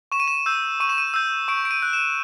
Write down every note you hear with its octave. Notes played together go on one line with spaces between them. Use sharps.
C#6 E7
D#7
E7
E6 G6
C#6 D#7
E7
D#7
E6 G6
C#6 D7
D7
D#7
F#6
E7